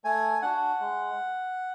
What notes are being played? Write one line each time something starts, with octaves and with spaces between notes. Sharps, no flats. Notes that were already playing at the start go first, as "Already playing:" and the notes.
A3 G#5
D4 F#4 F#5
G#3